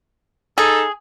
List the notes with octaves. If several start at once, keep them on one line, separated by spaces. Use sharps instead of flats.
D#4 G#4 A4